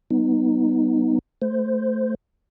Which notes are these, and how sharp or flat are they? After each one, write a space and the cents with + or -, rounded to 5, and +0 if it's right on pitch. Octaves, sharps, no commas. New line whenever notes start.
G3 -40 B3 +0 D#4 +0
A3 +0 C5 -10